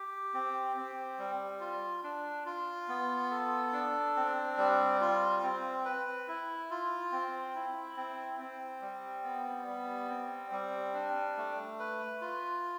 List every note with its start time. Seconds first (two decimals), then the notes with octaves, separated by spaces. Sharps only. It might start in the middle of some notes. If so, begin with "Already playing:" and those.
Already playing: G4
0.34 C4
0.76 C4
1.19 G3
1.61 F4
2.04 D4
2.46 F4
2.89 B3
3.31 A4
3.73 D4
4.16 C4
4.58 G3
5.01 F4
5.43 C4
5.85 B4
6.28 E4
6.70 F4
7.12 C4
7.55 E4
7.97 C4
8.39 C4
8.82 G3
9.24 B3
9.67 G3
10.09 C4
10.51 G3
10.94 D4
11.37 A3
11.79 B4
12.21 F4